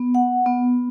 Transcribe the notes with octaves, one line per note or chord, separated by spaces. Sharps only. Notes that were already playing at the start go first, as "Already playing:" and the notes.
Already playing: B3
F#5
B3